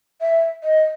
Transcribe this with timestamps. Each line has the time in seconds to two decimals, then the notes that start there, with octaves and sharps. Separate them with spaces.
0.21 E5
0.64 D#5